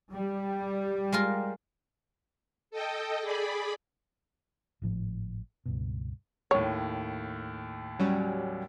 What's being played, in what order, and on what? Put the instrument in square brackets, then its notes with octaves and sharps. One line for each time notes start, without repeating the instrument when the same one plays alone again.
[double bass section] G3
[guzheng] G#3 F4 A#4
[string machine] A4 D#5 G5
G#4 D5 B5
[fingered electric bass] G#1 A2 F3
C#2 G2 B2
[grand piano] D#2 A2 [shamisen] C#5
[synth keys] F#3 G3 C#4